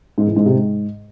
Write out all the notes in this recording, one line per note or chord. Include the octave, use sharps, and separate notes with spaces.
G#2
E3
G#2
C3
G#2